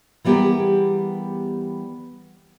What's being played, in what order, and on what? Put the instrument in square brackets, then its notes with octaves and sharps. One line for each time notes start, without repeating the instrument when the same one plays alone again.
[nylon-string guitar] E3 G3 B3 G4 G#4 A#4